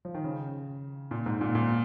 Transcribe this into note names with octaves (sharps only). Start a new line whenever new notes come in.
F3
D#3
C#3
A#2
G#2
A#2
A#2